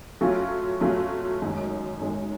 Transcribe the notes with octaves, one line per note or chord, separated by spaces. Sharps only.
F#3 A3 C#4 F4
F#3 A3 C#4 F4
F#2 D#3 G#3
F#2 D#3 G#3